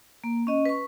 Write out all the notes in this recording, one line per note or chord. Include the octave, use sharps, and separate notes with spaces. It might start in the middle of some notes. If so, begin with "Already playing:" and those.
A#3
C#4 D#5
B4 C#6